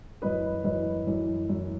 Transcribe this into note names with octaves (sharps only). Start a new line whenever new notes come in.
F#2 E3 B4 D#5
F#2 E3 B4 D#5
F#2 E3
F#2 E3